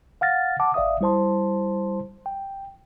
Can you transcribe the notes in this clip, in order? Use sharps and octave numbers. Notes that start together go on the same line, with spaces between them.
F5 F#5 F6 A6 A#6
F#5 A5 D6
G#1 D5 E5 F5 D#6
G3 E4 C5 A5 C6
G5